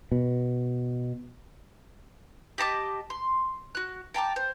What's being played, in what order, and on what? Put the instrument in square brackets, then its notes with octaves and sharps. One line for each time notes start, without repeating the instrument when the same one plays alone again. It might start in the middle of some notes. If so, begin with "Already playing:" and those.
[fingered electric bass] B2
[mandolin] G4 D#5 A5 D6
C6
F#4 F#6
G5 A5 A#5 D6
C5